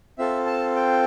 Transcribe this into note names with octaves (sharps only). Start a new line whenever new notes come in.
C4 F4 A4 E5
A5
G5